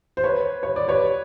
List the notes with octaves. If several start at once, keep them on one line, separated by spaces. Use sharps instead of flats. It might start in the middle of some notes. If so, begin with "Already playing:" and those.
C5
B4 C#5
C#5
D5
B4 C#5